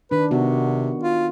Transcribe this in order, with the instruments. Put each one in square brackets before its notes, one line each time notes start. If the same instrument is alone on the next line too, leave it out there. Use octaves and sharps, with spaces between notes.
[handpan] D#3 D4 [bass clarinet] B4
[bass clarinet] C3 [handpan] B3 F#4
[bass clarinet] F4